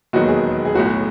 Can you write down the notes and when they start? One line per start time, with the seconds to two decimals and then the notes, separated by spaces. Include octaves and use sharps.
0.13 E1 D#2 D#3 F#3 B3 F#4
0.28 G#4
0.65 G#4
0.75 B1 A2 F#3 F#4
0.85 F#4